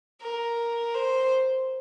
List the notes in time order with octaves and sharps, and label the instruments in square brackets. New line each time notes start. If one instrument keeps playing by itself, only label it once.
[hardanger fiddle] A#4
C5